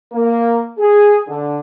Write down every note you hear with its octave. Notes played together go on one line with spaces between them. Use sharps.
A#3
G#4
D3